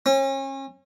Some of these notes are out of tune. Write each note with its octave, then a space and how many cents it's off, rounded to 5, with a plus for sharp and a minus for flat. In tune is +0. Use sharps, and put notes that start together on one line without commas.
C#4 -35